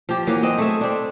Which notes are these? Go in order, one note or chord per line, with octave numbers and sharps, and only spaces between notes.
F3 G4
E3 F#3 A#3
C4 D#5
A3 G#4 E5
C4 D4